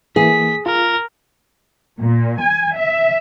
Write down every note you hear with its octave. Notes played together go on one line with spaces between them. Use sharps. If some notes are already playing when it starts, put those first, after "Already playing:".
E3 A#3 G#4 B6
F4 A#4
A#2
G#5
E5